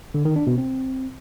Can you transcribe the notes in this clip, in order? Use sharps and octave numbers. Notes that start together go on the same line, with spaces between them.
D3
D#3
D4
B2
C4